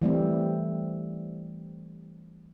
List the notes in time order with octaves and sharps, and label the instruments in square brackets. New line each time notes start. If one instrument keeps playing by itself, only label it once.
[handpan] E3 G3 A3 C4